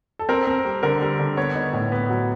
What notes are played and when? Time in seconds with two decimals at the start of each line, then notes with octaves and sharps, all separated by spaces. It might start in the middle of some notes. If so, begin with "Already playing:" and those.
0.19 A4
0.29 C4 A#4
0.47 C4
0.65 G3
0.83 D3 A#4
1.01 G3
1.19 D3
1.37 B3 C#5
1.55 D#4
1.73 A2
1.92 B3
2.09 F#3